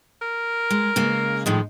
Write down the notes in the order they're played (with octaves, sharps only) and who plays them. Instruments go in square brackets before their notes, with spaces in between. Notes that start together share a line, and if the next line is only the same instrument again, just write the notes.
[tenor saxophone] A#4
[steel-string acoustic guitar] G#3
C#3 G#3 A#3
[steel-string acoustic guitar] A2 D#3 F3 [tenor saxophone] G#3